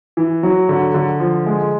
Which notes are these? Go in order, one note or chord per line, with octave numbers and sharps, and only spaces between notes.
E3
F#3
D3
D3
F3
G#3